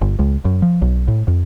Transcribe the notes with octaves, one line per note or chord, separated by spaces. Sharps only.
G1
C#2
F#2
F3
B1
A2
F2